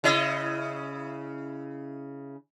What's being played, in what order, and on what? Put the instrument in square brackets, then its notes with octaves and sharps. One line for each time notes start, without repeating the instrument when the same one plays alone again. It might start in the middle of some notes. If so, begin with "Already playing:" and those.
[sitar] C#3 E4 D#5